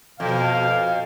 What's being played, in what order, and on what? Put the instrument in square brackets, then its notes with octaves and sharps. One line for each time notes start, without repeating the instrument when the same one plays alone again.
[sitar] F2 [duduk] B2 [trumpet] F5